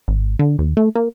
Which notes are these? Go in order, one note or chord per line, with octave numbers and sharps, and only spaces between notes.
G#1
D3
D#2
A3
A#3